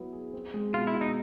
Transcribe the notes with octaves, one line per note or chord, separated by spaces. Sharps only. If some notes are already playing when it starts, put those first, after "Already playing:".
Already playing: F#3 B3 E4
G#4
C4
G#3
B2 F4
E4
B2
D#4